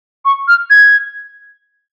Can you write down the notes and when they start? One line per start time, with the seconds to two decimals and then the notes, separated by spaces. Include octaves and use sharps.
0.25 C#6
0.48 F6
0.70 G#6